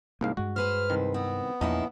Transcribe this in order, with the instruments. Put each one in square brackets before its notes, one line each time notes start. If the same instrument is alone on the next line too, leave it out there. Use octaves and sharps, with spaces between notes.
[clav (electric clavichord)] C2 G#2 F5 [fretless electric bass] A#3
[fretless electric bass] G2 G#3 [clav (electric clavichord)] F#4
[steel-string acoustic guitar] G#4 B4 C5 [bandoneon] F6
[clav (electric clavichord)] C2 D#3
[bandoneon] B3 [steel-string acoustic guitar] C4
[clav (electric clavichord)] A#1 D#4 [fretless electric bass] E2 [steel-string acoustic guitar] A#3 C#4 E4